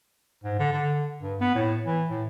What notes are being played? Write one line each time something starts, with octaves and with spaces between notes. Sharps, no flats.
G#2
D3
D3
G2
B3
A2
E3
A2